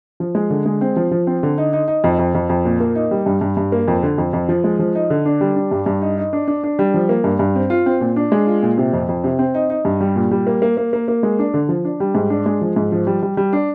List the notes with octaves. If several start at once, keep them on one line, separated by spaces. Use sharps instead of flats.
F3
G#3
D3
G#3
C4
F3
F3
C4
D3
D#4
D#4
D#4
F2
F2
F2
F2
A#2
A#3
D#4
G3
G2
G2
G2
A#3
F2
D3
F2
F2
F3
G#3
F3
D#4
D3
D4
G3
D4
G2
G2
D#4
D#4
D4
D4
D4
G3
F3
A#3
G2
G2
C4
F4
C4
A#2
D4
G#3
F4
A#2
C3
F2
F2
C3
C4
D#4
D#4
G2
G3
A#2
G3
A#3
A#3
A#3
A#3
A#3
G#3
D4
D3
F3
D4
G3
G#2
D4
G#3
F3
G#2
F3
G3
G3
G3
D4